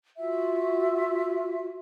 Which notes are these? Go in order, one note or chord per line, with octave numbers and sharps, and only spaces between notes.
F4 F#4 E5